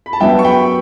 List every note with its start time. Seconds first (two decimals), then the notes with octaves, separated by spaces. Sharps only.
0.06 B5
0.13 A5
0.20 G2 F#3 B3 E5 G5
0.39 C#6
0.44 G5 B5